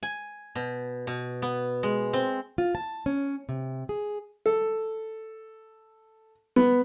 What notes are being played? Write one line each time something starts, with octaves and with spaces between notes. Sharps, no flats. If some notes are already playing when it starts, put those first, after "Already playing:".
G#5
B2
B2
B3
G#3
C4
F4
A5
C#4
C3
G#4
A4
B3